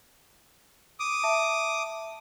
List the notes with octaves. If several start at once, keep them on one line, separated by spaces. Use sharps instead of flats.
D6 D#6
E5 A5